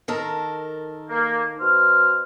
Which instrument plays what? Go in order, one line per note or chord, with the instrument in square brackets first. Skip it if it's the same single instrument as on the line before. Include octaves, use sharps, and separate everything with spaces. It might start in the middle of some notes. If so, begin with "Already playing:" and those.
[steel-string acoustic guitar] D#3 A4 A#4
[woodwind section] A#3
B2 C5 F6